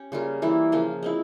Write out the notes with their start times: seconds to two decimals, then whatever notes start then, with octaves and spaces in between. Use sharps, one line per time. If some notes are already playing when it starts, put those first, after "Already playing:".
Already playing: C#4 G4
0.12 C#3 G3 A#3 F4
0.42 E3 G3 A#3 E4
0.72 C#3 F3 A#3 F4
1.03 G#3 C4 E4